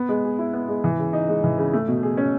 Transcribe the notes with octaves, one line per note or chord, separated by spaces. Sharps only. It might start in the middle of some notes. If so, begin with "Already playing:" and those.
Already playing: B3
G#3
G#4
E4
B3
G#3
E3
C#3
D#4
G#3
E3
C#3
A3
B2
G#4
C#4